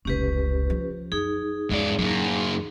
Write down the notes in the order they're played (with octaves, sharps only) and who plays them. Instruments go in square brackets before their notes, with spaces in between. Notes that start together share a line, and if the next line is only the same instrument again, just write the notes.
[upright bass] F1 C#2 [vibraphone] C#4 G4 B4
[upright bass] F3
[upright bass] F#2 [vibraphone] D#4 G#4
[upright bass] E2 [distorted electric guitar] G#2 D5
[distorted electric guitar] F#2 A#3 [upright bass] A2